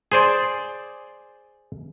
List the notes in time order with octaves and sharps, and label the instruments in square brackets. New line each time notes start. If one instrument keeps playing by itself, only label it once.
[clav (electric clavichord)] G#4 C5 D5